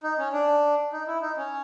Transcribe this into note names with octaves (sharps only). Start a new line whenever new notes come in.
D#4
C#4
D4
D#4
E4
D#4
C#4